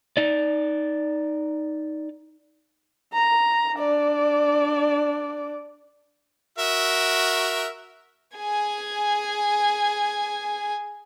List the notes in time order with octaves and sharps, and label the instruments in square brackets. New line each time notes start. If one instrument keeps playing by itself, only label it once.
[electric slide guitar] D#4 D5
[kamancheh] A#5
D4 D5
[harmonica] F#4 A#4 E5
[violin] G#4 G#5